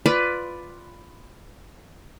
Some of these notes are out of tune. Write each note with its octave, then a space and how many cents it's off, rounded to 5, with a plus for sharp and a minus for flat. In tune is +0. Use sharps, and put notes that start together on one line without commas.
F4 +0 B4 +10 D5 +0